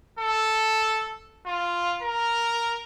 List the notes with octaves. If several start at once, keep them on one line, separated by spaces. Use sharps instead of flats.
A4
F4
A#4